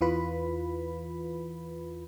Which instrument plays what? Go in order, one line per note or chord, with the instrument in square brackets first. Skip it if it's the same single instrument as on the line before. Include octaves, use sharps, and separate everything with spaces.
[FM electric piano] E2 E3 F4 B4 B5